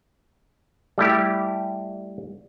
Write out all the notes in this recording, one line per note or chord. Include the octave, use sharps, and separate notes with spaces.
G3 A3 E4 G4